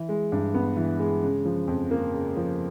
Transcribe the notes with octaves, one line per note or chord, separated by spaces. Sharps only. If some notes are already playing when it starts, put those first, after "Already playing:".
Already playing: E3
G#3
G2
B3
E3
G#3
C#3
F3
F2
A#3
C#3
F3